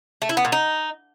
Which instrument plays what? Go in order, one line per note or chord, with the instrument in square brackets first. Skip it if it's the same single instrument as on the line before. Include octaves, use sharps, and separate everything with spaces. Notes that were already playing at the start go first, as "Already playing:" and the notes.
[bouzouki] A3
E4
B3
A#2
D#4